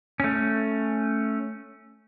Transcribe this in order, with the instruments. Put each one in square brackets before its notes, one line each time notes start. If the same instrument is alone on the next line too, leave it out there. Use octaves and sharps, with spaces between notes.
[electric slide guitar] A3 C#4